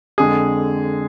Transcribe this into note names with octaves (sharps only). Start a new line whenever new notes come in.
F2 D3 G#3 G#4